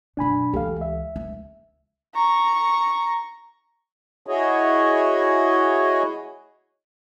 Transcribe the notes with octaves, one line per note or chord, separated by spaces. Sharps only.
F#2 B2 D4 G#5 B5
C#2 E3 G4 A4 F5
E5
C#2
A#5 C#6
E4 F#4 G#4 C#5 D#5